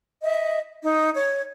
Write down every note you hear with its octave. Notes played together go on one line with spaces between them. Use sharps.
D#5 E5
D#4
C#5 G#6